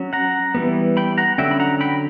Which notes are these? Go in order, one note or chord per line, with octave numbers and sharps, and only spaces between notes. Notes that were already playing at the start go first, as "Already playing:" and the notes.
Already playing: F#3 C#4
F#5 A#5
E3 G3 B3
G5 B5
F#5 A#5
D3 F#3 C#4 E5 G5
B5
F#5 A#5
G5 B5